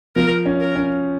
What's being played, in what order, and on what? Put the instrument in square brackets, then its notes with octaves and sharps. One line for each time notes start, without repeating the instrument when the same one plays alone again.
[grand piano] F3 [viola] A#4
[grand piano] C#4
[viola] A#4
[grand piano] C#4